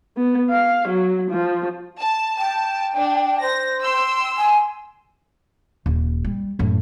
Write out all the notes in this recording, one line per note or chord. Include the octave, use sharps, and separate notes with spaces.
B3
F5
F#3
F3
A5
G5 A5
D4
C5 A#6
G5 C6 E6
G#5
D#1
G3
F#2 A2